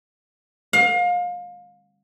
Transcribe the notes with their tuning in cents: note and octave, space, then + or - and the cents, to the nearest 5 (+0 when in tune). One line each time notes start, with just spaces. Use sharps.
F5 +30